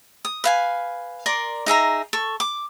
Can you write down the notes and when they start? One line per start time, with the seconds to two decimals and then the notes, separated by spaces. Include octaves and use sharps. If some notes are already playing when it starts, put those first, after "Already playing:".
0.25 D#6
0.44 B4 F5 G#5
1.26 A#4 D5 C6
1.66 D#4 G#4 E5 A#5
2.13 A4 C#6
2.40 D6